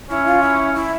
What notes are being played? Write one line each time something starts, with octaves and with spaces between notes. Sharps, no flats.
C#4 E4
F4
E4
E4